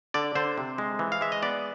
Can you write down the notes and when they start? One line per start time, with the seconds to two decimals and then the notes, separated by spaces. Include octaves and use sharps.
0.14 D3 D5
0.35 D3 C5
0.58 C3
0.78 G#3
0.99 E3
1.12 F5
1.21 G#3 E5
1.32 D#5
1.42 B3 D5